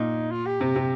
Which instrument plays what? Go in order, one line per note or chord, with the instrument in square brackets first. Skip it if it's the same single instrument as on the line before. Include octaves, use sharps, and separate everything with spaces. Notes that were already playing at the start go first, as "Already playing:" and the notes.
Already playing: [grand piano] A#2 [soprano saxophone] D#4
[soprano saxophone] F4
G4
[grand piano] C3
C3